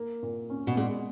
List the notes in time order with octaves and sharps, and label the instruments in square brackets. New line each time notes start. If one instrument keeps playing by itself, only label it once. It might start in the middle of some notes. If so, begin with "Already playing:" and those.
Already playing: [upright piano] A#3
A#2
C#4
[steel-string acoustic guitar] B2
[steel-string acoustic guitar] A#2 [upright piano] G#3